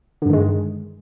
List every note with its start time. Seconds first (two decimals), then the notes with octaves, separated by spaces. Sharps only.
0.22 D3
0.26 G2
0.29 D#3
0.33 G#3